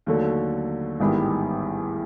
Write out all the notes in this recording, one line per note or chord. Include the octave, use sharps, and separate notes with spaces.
D#2 D3 F#3 A3
A1 G#2 D#3 G3 B3